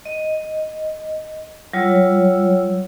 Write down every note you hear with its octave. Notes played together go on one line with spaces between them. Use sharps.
D#5
F#3 G3 F4 C#5 E6